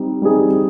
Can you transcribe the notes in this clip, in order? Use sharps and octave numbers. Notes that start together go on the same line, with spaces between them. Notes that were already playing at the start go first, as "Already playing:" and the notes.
Already playing: G3 C4 D#4
G3 C4 D#4 G#4